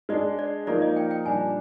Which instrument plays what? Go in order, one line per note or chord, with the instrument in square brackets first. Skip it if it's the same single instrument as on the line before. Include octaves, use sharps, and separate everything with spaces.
[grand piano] G#3 D4 G#4 [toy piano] D#5
[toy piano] D5
[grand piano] F3 A#3 D#4 A#4 [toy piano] D5
[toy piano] D#5
G5
G5
[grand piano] A#2 G3 D4 [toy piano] G#5